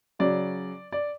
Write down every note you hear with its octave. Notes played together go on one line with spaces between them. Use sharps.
C#3 F#3 D5
D5